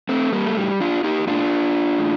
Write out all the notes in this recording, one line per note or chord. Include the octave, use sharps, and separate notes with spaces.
A3 C4
G3 A#3
A3
A2 G3
D4 F4
D#4 G4
A2 D4 F4
A2